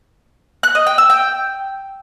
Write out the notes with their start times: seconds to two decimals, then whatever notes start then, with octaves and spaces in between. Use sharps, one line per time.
0.63 F#6
0.75 D#5
0.87 G5
0.98 E6
1.10 G5